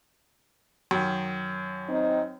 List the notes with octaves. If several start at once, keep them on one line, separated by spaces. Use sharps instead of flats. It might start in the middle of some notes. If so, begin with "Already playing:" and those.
F#2 D#3
C4 D#4